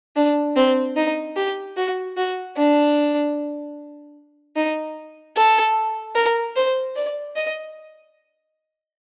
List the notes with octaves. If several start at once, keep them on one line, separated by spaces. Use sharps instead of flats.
D4
C4
D#4
G4
F#4
F#4
D4
D#4
A4
A#4
C5
D5
D#5